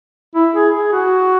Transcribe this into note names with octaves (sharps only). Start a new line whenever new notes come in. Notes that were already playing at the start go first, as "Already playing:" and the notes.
E4
G#4
G#4
F#4